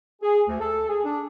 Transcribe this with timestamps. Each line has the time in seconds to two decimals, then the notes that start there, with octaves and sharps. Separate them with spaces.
0.22 G#4
0.48 D2
0.61 A4
0.89 G#4
1.04 D4